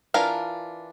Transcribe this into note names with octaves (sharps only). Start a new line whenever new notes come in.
E3 D4 F4 A#4 F5